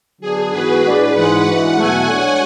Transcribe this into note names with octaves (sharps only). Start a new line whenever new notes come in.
D3 F#3 B3 D4 G#4
G#2 E3 B3 F#4 B4
A2 G#3 D4 G#4 D5
G#2 E3 G#3 F#5
E3 G#3 D4 F#4
E2 B2 F#3 A3 G#5
G#3 D4 F#4 A4 C#5